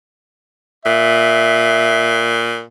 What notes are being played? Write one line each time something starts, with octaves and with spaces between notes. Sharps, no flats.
A#2 E5